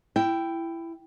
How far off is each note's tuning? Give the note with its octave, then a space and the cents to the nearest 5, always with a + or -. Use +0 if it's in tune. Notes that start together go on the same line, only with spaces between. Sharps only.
E4 +15 G5 +0